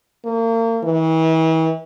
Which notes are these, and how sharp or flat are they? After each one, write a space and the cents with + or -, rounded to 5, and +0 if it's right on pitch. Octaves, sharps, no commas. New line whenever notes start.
A#3 -35
E3 -40